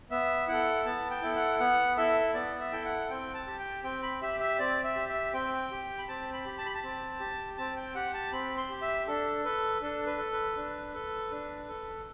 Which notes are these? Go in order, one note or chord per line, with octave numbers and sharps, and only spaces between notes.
B3 E5
E4 A4 F#5
B3 A5
G5
E4 A4
F#5
B3 F#5
E4 A4 E5
B3 D5
E5
E4 A4 G5
F#5
C4 G5
A5
G4
G5
C4 G5
B5
G4 E5
E5
C4 D5
E5
G4
E5
C4 G5
G4
B5
C4 A5
B5
G4
A5
B5
A5
C4
G4
C4 A5
G5
G4 F#5
A5
C4 B5
C6
G4
E5
D4 A4
A4 B4
D4 A4
B4
A4
B4
D4
A4
D4
A4